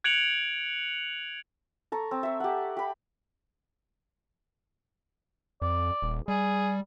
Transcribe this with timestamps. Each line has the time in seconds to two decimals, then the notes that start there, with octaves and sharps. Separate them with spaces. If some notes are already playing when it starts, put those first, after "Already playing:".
0.04 F#6 G#6 C#7 D7 F7 F#7
1.92 A4 A#5 C#6
2.11 C4
2.23 E5 C#6
2.40 G4 F#5
2.77 G4 B5
5.62 F2 D5
6.02 D#1
6.28 G3 G#4